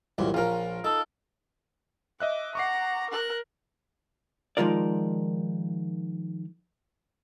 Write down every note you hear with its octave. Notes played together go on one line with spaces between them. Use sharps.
C2 F#2 A#2 E3
A#1 C#4 F4 A#4
D#4 A4
D#5 E5 D6 F#6
F#5 A#5 C#6 D6 C7
A#4 F#6
D#3 F3 G#3 F4 A#4 D5